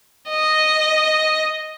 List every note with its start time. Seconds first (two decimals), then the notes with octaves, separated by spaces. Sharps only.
0.29 D#5